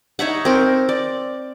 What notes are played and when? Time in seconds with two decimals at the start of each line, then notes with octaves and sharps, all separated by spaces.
0.19 D#4 C#5 E5 F#5
0.45 C4 A#4
0.89 D5